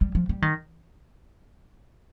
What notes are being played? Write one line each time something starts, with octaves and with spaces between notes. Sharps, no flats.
G3
F3
G3
D#3